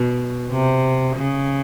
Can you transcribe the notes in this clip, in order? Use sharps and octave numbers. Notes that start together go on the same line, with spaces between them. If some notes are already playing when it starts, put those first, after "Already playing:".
Already playing: B2
C3
C#3